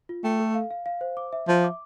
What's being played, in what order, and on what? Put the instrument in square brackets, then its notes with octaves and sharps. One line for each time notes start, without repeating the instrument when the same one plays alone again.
[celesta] F4
[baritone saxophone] A3 [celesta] G5
[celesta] A4
F5
F5
F5
C5
D6
E5
[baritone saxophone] F3 [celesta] E5
[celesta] D6